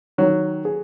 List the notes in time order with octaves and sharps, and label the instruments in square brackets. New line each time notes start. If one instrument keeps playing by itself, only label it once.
[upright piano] D#3 [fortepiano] F#3
[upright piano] G#4